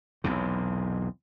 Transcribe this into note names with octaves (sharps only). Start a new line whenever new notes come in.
B1 E2 C3